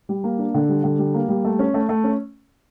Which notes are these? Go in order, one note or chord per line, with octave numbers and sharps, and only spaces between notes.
G3
A#3
D4
D3
G3
D3
G3
A#3
G3
A3
C#4
A3
A3
C#4